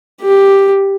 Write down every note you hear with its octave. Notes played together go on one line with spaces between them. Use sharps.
G4